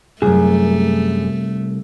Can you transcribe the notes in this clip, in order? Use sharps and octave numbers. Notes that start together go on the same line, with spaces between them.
C2 F#2 A3 G#4